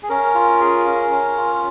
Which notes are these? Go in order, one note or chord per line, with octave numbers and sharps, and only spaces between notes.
G#4
C#4 A#4
F4
G#4
C#4
C#4
F4